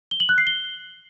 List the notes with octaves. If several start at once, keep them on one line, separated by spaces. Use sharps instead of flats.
G7
F#7
F#6
C7
G7